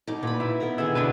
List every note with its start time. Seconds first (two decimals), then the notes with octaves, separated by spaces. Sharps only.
0.07 B2 D#4 D5
0.23 A#2 B4 B5
0.40 E4
0.60 B3 A#4 A#5
0.78 D3 D#3 E4 G#4
0.95 B2 D4 E4 B4